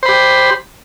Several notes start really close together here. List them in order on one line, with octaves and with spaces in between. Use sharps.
C5 B5 G4